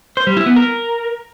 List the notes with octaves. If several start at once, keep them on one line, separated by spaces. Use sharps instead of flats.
C5
G3
E4
B3
A#4